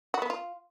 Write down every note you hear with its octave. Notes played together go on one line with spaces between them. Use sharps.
F#4
B3
F4